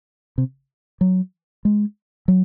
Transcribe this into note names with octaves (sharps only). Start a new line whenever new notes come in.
C3
F#3
G#3
F#3